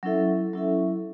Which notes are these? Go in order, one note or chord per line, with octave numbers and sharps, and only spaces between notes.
F#3 C#4 E4 A4 E5
F#3 C#4 E4 A4 E5